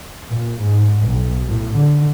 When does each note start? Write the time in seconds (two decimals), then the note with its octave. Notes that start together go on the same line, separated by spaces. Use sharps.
0.30 A#2
0.62 G#2
1.07 B1
1.47 A2
1.76 D3